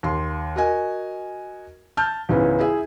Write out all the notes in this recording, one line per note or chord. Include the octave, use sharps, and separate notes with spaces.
D#2 C6
F#4 A#4 D#5 G#5
A5 F6 G6
C#2 G#2 E3 B3 C#4
E4 G#4 E5